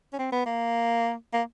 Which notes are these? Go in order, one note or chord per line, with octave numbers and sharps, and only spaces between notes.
C#4
C4
B3
A#3
A#3